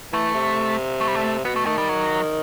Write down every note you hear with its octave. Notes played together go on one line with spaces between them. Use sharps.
E3 A3
C3
A3
G3
A3
B2 B3
A3
D#3 A3
G3
F#3